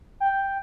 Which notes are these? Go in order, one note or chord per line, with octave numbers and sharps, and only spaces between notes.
G5